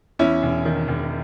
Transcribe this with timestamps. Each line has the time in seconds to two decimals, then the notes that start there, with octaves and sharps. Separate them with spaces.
0.19 E2 C#4 E4
0.43 E1
0.65 D#3
0.88 E1